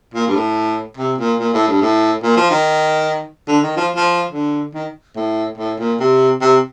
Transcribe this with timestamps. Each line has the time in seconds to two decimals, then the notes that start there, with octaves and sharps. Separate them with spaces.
0.14 A#2
0.28 G2
0.35 A2
0.97 C3
1.18 A#2
1.39 A#2
1.54 A2
1.68 G2
1.82 A2
2.23 A#2
2.37 F3
2.51 D#3
3.48 D3
3.63 D#3
3.77 F3
3.96 F3
4.32 D3
4.74 D#3
5.16 A2
5.58 A2
5.79 A#2
6.00 C3
6.41 C3